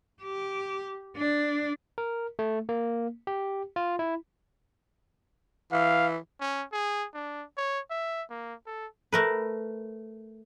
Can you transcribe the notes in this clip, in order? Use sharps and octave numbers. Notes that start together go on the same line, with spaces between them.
G4
D4
A#4
A3
A#3
G4
F4
E4
E3 F5
C#4
G#4
D4
C#5
E5
A#3
A4
A3 A#4 B4